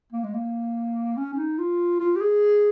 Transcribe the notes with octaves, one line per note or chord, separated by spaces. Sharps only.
A#3
G#3
A#3
C#4
C#4
D#4
F4
F4
G4
G#4